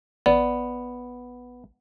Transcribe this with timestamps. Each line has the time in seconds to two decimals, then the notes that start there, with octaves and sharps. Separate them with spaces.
0.26 A1 B3 D5